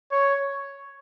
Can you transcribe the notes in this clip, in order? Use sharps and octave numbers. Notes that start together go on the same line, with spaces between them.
C#5